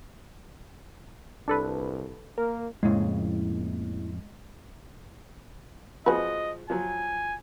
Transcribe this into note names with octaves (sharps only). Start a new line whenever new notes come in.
C2 D4 A4 B4
A#3 A#4
F2 A2 C#3 F3 G#3 A#3 E4
F3 G#3 C4 F#4 B4 D#5
F3 F#3 G#5